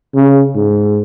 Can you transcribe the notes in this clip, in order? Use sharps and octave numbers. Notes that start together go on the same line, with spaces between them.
C#3
G#2